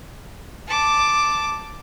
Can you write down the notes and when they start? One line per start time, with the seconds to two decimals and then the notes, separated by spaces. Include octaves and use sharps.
0.68 A5 D6